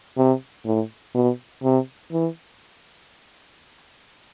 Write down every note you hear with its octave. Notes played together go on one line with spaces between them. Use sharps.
C3
A2
B2
C3
E3